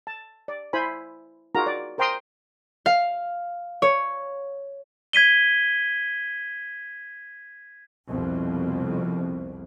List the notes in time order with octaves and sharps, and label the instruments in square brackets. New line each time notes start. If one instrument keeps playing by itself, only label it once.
[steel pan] A5
D5
E4 C5 G#5 B5
D#4 F4 F#4 G#4 A#4 A#5
D5
A#4 C5 G5 A#5 C6 D#6
[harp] F5
C#5
[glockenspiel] G#6 B6 D#7 G7
[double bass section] C2 F2 B2